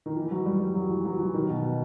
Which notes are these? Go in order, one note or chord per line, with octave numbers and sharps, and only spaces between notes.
D#3
E3
F#3
G3
G3
F#3
E3
F#3
E3
D#3
B2